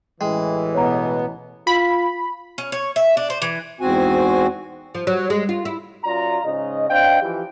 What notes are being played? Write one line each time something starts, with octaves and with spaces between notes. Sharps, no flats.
A1 E3 G#3 G5
B2 B3 C#5 A#5
F4 B5
C#4
C#5
E5
D4
C5
E3
E2 G#2 C4 F#4 G#5
F3
F#3
G#3
F4
E4
F#2 F4 D5 A#5
G#2 C#3 D#5
C4 D4 D#5 F5 G5
E3 F3 G4